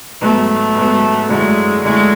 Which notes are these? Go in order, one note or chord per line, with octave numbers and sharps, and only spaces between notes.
G#2 F#3 A3 B3
G#2 F#3 B3
F#2 D3 G#3 A3 E4
F#2 D3 G#3 A3 E4